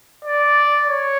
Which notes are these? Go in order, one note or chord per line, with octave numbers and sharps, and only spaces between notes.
D5
C#5